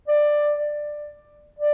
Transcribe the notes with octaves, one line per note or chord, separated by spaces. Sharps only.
D5
D5